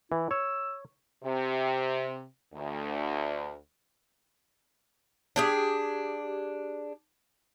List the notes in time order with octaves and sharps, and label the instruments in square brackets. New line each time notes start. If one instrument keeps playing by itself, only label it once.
[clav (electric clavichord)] E3 [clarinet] E4
[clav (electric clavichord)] C#5 [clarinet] E6
[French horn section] C3
D2
[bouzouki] D4 G4 G#4